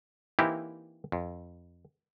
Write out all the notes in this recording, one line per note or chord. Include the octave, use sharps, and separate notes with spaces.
E3 A#3 C4 D#4 E4 G4
F2